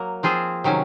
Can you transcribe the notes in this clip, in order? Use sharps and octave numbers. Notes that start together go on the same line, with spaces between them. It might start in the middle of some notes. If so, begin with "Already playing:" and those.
Already playing: F#3 A#3
F3 C4 F4 G#4 C5
C3 D#3 F#3 C#4